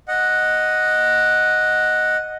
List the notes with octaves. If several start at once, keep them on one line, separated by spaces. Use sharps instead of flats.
D#5 F#5